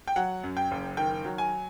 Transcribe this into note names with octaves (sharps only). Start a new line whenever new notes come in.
G5
F#3 F#5
F#2
G5
F#1
D#3 G5
F#3
G#5